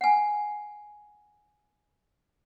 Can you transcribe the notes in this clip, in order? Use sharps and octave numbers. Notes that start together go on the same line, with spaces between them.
F#5 G#5